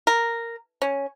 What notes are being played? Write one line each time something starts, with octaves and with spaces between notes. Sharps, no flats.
A#4
C#4